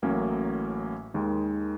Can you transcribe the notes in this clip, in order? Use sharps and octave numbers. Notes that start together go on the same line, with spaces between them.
A1 A2 F#3 A#3 C#4
D#2 D#3 G#3